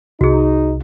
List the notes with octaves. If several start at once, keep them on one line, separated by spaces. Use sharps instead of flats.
C2 D#4 F#4 G#4